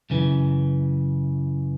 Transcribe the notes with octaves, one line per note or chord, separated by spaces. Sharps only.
F#2 C#3 E3